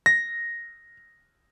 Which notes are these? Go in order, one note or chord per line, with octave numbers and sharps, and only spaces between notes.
A#6